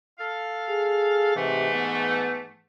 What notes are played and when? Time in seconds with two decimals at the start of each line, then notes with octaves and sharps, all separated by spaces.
0.19 A4 F5
0.69 G#4
1.36 G#2 C3 E3 A3
1.73 B3